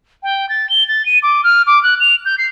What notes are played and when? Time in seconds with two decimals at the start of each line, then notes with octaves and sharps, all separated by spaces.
0.23 G5
0.49 A6
0.70 G7
0.88 A6
1.06 D#7
1.23 D6
1.44 F6
1.67 D6
1.83 F#6
2.00 F7
2.25 G6
2.38 C7